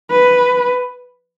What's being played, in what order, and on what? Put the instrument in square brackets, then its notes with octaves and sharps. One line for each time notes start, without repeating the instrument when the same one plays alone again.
[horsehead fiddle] B4